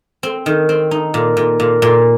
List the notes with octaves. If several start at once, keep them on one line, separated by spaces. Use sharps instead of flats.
C4
D#3
C4
D#4
A#2
A#2
A#2
A#2